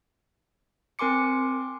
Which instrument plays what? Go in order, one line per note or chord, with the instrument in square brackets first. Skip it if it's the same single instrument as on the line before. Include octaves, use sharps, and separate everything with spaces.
[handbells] C4 A#4 G#5 C6 D6 C#7